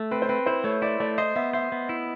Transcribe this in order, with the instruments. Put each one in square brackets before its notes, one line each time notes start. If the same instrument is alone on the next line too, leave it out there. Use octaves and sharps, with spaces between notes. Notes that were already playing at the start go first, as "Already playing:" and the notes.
Already playing: [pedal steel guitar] A3
[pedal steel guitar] C4 [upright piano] B4
[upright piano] C5
[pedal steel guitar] C4 [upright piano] B4
[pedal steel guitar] E4 [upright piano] C5
[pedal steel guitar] A3 [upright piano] C#5
[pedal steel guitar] E4 [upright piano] D5
[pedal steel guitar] A3 [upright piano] D5
[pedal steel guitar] C5 [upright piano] D#5
[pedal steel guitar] B3 [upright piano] E5
[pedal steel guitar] C5 [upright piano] E5
[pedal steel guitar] B3
E4